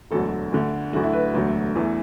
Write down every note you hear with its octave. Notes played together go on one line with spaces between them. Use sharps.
E1 D2 D3 F#3 A4
D2 D3 A3
D2 D3 F#3 A3 F#4
E4
B4
E1 D2 D3 F#3 A3
E2 E3 A3